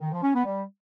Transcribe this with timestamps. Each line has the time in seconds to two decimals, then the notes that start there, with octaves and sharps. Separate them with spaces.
0.01 D#3
0.12 F3
0.23 C#4
0.34 B3
0.45 G3